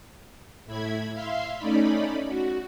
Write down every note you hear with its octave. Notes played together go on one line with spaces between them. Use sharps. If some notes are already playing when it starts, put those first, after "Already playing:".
A2 E4 B5 G#6
E5 F5 C6
A3 C#4 D#4 D5 B5
F#4